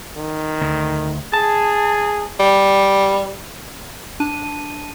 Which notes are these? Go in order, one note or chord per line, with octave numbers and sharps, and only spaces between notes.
D#3
D2
G#4 A5
G3
D4 A5 D#7